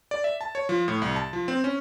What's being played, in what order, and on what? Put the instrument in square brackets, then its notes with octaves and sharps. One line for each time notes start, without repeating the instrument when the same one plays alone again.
[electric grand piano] D5
E5
A5
C#5
F3
A2
C2
A5
F3
C4
C#4